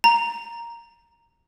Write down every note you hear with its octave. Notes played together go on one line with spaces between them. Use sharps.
A#5